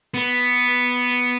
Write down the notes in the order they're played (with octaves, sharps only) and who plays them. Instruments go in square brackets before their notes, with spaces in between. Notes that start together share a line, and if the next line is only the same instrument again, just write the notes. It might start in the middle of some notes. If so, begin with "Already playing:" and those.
[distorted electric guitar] B3